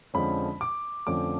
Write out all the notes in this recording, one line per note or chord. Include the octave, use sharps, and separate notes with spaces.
F2 D3 F3 G#3 C#4 B5
D6
F2 D3 F3 A3 C#4 D6